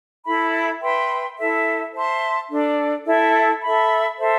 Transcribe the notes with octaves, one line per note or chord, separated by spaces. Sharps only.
E4 A4 E5 B5
B4 E5 G5 C6
E4 A4 E5
C5 E5 A5 C6
D4 A4 D5
E4 A4 E5
A4 E5 B5
A4 C5 E5